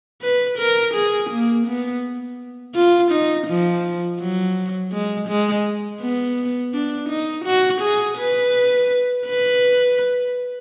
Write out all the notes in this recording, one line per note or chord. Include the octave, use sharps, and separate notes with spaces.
B4
A#4
G#4
A#3
B3
F4
D#4
F3
F#3
G#3
G#3
B3
D4
D#4
F#4
G#4
B4
B4